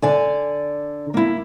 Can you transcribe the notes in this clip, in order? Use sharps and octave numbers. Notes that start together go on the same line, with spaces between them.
D3 D5 G#5
A#3 E4